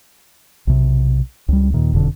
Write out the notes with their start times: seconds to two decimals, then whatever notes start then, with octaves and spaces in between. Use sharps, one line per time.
0.67 B1 C3
1.48 C#2 G3
1.74 D#2 A#2 D#3
1.93 F#1 F2 B2 D3